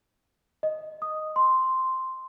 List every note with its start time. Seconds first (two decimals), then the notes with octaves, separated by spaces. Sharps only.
0.63 D#5
1.02 D#6
1.36 C6